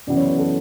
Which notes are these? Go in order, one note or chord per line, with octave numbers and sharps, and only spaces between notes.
F#2 C#3 E3 B3 D5
C#5
B4
A4